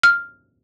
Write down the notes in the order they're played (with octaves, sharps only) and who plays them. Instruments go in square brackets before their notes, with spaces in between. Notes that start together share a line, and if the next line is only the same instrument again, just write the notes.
[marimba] F6